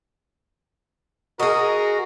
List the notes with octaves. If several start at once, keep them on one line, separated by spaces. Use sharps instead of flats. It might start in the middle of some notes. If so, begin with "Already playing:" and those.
F#4 G#4 A#4 D#5